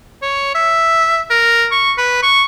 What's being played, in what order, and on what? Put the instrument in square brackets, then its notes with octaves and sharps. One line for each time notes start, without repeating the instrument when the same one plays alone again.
[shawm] C#5
E5
A#4
C#6
B4
C#6